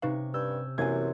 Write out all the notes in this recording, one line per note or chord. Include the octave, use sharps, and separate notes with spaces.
C3 C#4 D#4 B4 F5 C#6
G2 E6 G6 G#6
F#2 C3 E3 A#3 C#4 C5 G#5 G#6